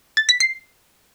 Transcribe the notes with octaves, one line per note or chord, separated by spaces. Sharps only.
A6
B6
C7